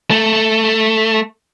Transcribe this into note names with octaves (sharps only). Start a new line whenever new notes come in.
A3